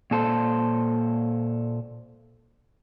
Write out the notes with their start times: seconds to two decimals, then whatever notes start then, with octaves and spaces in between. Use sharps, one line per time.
0.11 A#2 A4 C5